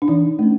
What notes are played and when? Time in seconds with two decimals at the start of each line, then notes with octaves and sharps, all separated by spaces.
0.02 D4
0.08 E3 D#4
0.39 A3 C#4